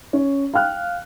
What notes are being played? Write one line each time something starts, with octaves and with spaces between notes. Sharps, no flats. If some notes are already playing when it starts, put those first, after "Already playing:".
C#4
F5 G5 F6 F#6